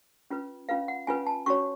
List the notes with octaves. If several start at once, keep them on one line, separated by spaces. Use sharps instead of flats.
C#4 F4 B4
C#4 F4 B4 F5
F#5
C#4 F4 B4 G#5
A5
C#4 F#4 C#5 C#6